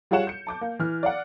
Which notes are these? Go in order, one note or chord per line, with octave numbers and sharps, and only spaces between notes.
G3 F4 G#4 C#5 F#5 E7
G6 C#7
A5 D6 G6
A#3
E3 F6
D5 F5 F#5